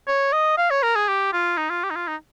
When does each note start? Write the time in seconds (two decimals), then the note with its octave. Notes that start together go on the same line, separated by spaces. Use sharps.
0.07 C#5
0.33 D#5
0.57 F5
0.71 C#5
0.83 A#4
0.96 G#4
1.08 G4
1.33 F4
1.57 D#4
1.70 F4
1.83 G4
1.90 D#4
1.96 F4
2.07 D#4